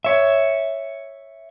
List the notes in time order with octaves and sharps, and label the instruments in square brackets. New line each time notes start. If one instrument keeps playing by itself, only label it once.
[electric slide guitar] C#5 E5